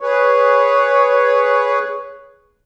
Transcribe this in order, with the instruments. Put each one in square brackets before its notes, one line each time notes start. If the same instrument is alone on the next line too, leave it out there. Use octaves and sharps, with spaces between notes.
[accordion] G#4 B4 [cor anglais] C#5